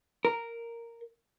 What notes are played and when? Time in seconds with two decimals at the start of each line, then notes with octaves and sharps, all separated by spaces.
0.25 A#4